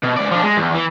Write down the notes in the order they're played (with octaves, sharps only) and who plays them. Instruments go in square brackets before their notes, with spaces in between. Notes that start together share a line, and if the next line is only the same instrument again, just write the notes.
[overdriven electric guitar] B2
C#2 D5
F3 D4
G#3
E2
E3